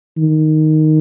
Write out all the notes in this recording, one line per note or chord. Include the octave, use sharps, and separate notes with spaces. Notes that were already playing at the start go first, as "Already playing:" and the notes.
D#3